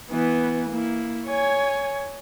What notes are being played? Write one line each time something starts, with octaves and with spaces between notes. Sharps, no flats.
E3 B3
A#3 E4
C#5 G#5